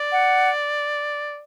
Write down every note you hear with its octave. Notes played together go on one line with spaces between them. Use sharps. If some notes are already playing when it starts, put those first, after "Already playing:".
Already playing: D5
F#5